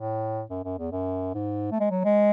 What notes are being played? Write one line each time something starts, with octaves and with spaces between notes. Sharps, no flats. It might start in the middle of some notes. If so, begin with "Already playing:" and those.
Already playing: A2
F#2
F#2
E2
F#2
G#2
A3
G#3
F#3
G#3